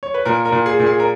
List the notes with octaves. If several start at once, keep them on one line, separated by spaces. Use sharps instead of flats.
C#5
B4
A#2 A#4
A#4
A#2
G#4
A#2
G#4
A#4